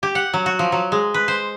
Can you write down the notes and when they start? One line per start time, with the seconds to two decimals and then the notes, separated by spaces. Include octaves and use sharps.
0.03 G4
0.15 F#5
0.34 F#3
0.46 F#4
0.59 F3
0.72 F#3
0.92 G#3
1.14 B4
1.28 C5